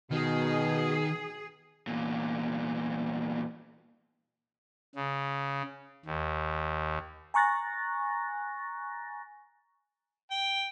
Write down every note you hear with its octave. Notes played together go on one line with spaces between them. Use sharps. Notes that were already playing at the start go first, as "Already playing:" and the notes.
B2 D#3 G#4
E2 A#2
C#3
D#2
G#5 A#5 C#6 F#6 A6 A#6
G5